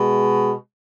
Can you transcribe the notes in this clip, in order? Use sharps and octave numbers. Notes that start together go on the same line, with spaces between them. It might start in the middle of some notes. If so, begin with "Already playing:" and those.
Already playing: B2 G#3